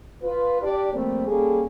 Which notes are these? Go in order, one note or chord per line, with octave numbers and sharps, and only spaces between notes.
F4 B4
D4 G4 D5
F3 G3 A3 A#3 C4
G3 A#3 C#4 G#4 A4